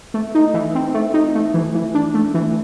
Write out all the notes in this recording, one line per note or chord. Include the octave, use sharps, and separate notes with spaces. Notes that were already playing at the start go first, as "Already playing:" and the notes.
A3
D#4
E3
C4
A3
D#4
A3
E3
E3
D4
A3
E3